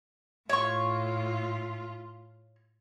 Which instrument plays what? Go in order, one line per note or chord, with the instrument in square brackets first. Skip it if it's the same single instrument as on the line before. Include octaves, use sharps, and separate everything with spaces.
[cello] A2 F4 [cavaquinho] C#5 C#6